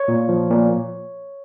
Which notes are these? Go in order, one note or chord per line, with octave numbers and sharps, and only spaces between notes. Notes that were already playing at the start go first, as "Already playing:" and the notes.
Already playing: C#5
A#2
F3
A#2